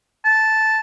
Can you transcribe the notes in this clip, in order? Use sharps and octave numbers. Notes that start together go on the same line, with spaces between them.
A5